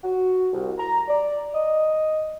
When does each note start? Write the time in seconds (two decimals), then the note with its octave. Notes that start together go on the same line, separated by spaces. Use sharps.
0.04 F#4
0.53 C2
0.78 A#5
1.08 D5
1.54 D#5